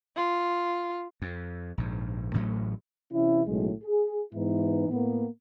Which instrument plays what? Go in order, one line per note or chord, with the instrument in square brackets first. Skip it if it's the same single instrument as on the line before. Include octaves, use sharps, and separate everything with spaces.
[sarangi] F4
[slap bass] F2
A#1 G#2
A1 A2 F#3 A3
[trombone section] C3 E3 C#4 E4
B1 A2 C#3 F#3 G#3
G#4
G#2 E3 B3 D#4 E4
A2 A#3 B3